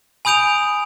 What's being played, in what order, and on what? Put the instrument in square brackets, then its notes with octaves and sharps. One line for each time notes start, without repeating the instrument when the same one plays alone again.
[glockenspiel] G#5 B5 D#6 G6 D7 F7